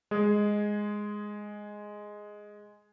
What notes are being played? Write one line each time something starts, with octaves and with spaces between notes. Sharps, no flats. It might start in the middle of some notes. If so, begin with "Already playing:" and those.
G#3 G#4